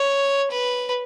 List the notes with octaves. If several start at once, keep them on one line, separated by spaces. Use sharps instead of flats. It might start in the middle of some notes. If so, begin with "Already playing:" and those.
Already playing: C#5
B4